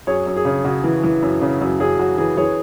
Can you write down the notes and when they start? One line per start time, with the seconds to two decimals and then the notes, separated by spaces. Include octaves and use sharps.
0.07 F#2 G#4 C#5
0.26 F#2
0.37 G#4
0.45 C#3
0.65 C#3 F#4
0.84 E3
1.04 E3
1.22 F#2
1.42 C#3
1.61 F#2
1.80 F#2 G#4
1.99 F#2 F#4
2.18 E3 G#4
2.37 E3 G#4 C#5